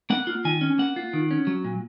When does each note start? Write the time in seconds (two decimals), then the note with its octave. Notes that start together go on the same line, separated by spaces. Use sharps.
0.10 A#3 F#5
0.27 F4
0.45 D#3 G#5
0.61 C#4
0.78 A#3 F#5
0.96 F4
1.13 D#3
1.31 C#4
1.47 F#3
1.65 A#2